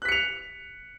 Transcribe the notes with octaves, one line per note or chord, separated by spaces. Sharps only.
F#6 B6 C#7 F7